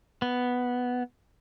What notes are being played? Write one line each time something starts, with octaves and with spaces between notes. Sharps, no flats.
B3